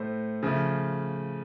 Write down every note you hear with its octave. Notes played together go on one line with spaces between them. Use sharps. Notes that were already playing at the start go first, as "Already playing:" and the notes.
Already playing: A2 A3 C5
C#3 F3 A3